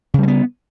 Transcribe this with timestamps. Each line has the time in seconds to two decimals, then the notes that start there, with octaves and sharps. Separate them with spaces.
0.14 C#3
0.18 G3
0.23 G#3
0.28 B3